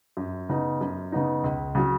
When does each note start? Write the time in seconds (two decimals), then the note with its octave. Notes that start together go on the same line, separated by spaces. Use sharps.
0.17 F#2
0.49 C#3 B3 D#4
0.81 F#2
1.12 C#3 B3 D#4
1.44 C#2
1.75 C#3 F#3